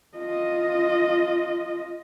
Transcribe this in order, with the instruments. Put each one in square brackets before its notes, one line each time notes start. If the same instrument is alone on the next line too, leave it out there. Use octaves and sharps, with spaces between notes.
[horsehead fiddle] F4 D#5